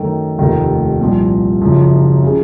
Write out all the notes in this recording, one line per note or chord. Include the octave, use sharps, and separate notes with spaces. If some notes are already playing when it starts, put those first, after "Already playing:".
Already playing: F#2 D#3 A3
F1 D#2 D#3 A3
C2 A#2 F3
F#1 F#2 F3
C#3 F3